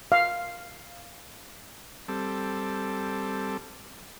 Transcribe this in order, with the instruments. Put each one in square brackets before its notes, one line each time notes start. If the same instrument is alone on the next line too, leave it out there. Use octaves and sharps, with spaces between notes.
[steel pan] F5
[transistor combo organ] G3 C4 A4